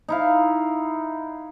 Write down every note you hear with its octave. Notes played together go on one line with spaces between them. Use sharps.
D#4 E4 F5